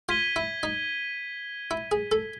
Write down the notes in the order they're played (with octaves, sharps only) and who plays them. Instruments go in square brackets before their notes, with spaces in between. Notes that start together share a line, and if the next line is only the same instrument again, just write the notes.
[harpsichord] F4 [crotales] G#6 B6 D#7 G7
[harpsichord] E4
D#4
E4
G#4
A4